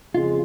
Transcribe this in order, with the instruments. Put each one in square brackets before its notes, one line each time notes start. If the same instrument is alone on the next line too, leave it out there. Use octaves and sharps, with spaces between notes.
[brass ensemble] F2 C#3 G#3 [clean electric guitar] F4